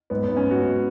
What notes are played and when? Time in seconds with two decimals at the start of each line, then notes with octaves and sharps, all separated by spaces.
0.10 G#2 B3
0.23 B3
0.28 G#2
0.37 C#4
0.46 G#2
0.51 F#4
0.63 G#2